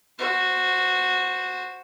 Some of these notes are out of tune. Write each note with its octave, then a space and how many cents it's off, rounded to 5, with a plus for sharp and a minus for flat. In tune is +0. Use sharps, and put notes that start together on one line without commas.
F#4 -10 C5 +0